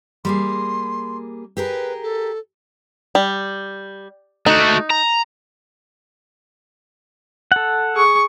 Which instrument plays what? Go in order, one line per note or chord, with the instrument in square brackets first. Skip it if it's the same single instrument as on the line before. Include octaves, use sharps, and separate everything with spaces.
[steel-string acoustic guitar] G3 A#3 G#4 [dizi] C6
[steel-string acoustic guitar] G4 G#4 A#4 [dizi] B4
[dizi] A4
[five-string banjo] G3
[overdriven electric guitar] A3 F#4 [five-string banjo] D#4
[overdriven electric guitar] A#5
[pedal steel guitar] A4 F#5
[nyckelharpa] G#4 C#6